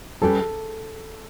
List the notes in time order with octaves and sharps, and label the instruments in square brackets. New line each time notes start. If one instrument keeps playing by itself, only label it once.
[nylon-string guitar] G3 C#4 G4 B4 [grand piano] A4